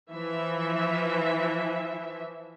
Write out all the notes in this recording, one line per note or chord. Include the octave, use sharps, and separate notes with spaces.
E3 F3 E5